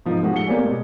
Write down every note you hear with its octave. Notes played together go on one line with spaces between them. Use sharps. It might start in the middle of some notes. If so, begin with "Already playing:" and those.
G#2 F3 D#4
A2 F3 G#3 D#4 F#4 G4
A3 C#7 G7
A#3 C4 G4 C#5 D5 G#5
B2 G#3